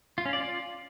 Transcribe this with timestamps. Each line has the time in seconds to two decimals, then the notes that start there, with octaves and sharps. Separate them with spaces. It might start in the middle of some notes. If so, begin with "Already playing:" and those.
0.18 F4
0.25 C#4
0.33 D5
0.41 F4